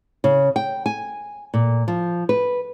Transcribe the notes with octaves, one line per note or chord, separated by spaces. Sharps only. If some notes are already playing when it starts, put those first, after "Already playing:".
C#3
G5
G#5
A#2
F3
B4